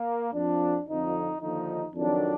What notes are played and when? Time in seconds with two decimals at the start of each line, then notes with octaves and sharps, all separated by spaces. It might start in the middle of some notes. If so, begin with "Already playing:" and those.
Already playing: A#3
0.32 F2 F3 D4
0.86 F2 D3 F3 D#4
1.40 D#2 D3 F3 D#4
1.94 F2 D#3 F#3 D4